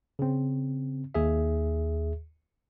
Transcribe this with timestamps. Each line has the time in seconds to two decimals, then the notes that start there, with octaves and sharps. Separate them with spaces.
0.19 C#3 C4
1.15 D#2 G#4 E5